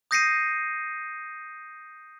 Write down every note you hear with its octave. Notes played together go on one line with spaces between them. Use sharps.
D#6 G6 A#6 C7 C#7 D#7